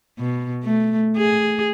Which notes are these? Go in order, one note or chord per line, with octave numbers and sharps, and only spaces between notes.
B2
A3
G#4